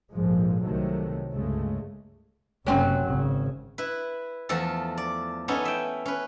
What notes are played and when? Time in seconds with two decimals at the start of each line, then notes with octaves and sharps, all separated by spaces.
0.12 A#1 F2 G#2 F3 G#3
0.63 C2 C3 D#3 F#3 A3
1.33 C#2 G2 C#3 G#3 A3
2.67 F#1 C3 F#3 C4 C#4
3.06 G#1 C#3
3.78 E4 B4
4.49 E2 F3 A3 A4
4.97 D5
5.48 B3 C#4 D#4 E4 A4
5.65 E5 G5
6.05 C#4 B4